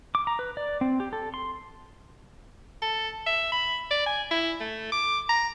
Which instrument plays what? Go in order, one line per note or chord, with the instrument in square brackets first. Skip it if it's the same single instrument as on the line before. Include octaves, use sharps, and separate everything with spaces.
[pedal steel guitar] D6
A#5
B4
D5
C4
G4
A4
C6
[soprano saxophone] A4
E5
B5
D5
G#5
E4
A3
D6
A#5